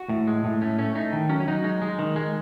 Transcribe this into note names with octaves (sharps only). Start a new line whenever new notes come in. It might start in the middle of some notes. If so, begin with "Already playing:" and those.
Already playing: F#4
A2
G#3
A2
A3 C#4
A3 C#4
A3 D#4
D#3
F#3 C#4
C#4
F#3 D#4
G#3 D#4
G#3
D#3
G#3